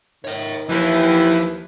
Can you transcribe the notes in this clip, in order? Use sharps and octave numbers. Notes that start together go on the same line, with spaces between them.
D#3 C#5 E5
D#2 E3 F3 E4